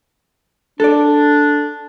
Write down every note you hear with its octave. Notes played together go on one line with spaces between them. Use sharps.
D4 A4 D5